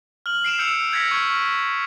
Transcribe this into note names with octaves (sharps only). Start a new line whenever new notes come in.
F6 F#7
C7 D7 E7 F7
E6 G6 C#7 D7 E7 F7
E6 G6 G#6 A#6 B6 C#7
C#6 F6 D7